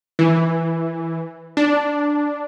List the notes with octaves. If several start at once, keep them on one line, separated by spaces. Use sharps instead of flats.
E3
D4